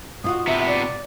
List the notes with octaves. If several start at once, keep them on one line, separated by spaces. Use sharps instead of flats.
G#2 F4 F#4 D#6
C3 B3 E5
D5